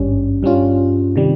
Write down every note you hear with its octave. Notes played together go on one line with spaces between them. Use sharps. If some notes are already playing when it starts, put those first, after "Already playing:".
Already playing: G#1 G2 G3 C#4
G2 G3 C#4 F4
C3 D#3 G3